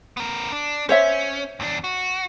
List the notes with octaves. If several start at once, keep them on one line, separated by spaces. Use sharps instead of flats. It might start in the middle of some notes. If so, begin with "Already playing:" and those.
B3 A#4
D4
C#4 C5 C#5 E5
E2 D4
F#4